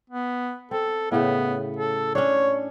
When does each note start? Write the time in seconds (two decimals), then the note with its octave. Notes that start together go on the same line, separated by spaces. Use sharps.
0.10 B3
0.71 C4 A4
1.12 A2 C#3 B3
1.77 A4
2.15 C#4 D4 C#5